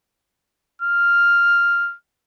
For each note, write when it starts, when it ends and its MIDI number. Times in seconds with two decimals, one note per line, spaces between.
0.82 1.95 89